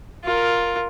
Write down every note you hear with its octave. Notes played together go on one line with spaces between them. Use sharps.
F4 A#4